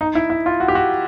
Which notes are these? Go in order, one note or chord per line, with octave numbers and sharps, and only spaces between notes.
D#4
E4
E4
F4
F#4
G4
F#4